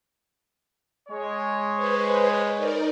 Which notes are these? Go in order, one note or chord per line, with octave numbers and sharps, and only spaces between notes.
G#3 C#5
B4 C5
D#4 A#4 D5